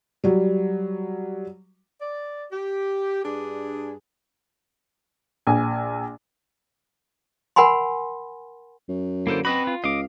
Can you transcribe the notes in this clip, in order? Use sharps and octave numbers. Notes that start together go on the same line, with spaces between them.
F#3 G3
D5
G4
G2 D4 G#4
A#1 G#5
A#4 F#5 G#5 B5 C6
F#2
D3 A#3 E4 A4 C5
C4 F#4 B4 D#5 B5
F4
C#2 D#5 F5 D6